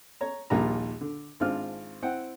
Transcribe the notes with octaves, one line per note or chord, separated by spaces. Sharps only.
C#5 A#5
A#1 D#2 A#2 G3 F4 A#5
D3
G#1 C4 D4 F4 F6
C4 E4 F#5 G5